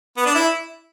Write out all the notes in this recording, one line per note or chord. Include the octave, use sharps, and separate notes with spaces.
B3
D4
E4